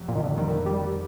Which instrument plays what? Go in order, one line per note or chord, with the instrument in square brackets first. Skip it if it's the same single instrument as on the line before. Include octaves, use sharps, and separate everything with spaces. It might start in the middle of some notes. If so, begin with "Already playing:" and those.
Already playing: [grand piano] F1 F2 C3
[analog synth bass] A#2
D#3
D3
[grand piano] F2 D3 G3 A#3 [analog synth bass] D#3
[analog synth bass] G3